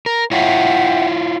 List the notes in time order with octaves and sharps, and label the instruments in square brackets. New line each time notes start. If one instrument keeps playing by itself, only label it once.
[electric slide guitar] A#4
[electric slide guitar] E4 F4 C#5 [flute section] E5 F#5 G5